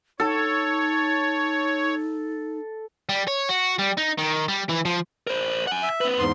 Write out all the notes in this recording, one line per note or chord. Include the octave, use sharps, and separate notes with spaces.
D#4 A4 C#5
G3
C#5
F#4
G3
D#4
D#3
G3
E3
F3
A#4 C5
F#5 G#5
E5
C4 B4
E2 G#2 C6